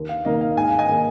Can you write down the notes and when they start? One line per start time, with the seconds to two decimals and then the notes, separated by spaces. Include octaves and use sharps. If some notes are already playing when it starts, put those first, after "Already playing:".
Already playing: D#2
0.09 F5
0.25 D#3 A#3 D#4 D#5
0.41 F5
0.57 G#2 G#5
0.68 F5
0.78 D#5 G#5
0.89 D#3 A#3 G#4